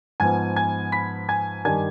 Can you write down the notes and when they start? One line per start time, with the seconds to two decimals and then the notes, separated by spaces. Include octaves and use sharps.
0.20 G#2 F3 B3 G#5 G#6
0.56 G#5 G#6
0.92 B5 B6
1.29 G#5 G#6
1.65 G2 D#3 G3 D4 G#5 G#6